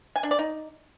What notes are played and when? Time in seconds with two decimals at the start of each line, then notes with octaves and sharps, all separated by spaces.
0.16 G#5
0.23 D4
0.31 D5
0.39 D#4